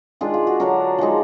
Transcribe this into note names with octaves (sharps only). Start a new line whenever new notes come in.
D#3 G#3 D4 F4 G#4
F4
F#4
D3 F#3 D4 F#4 A#4
F3 G#3 D#4